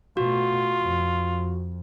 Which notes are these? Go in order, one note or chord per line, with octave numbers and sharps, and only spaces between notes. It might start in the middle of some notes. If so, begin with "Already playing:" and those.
B2 A3 F4 F#4
F2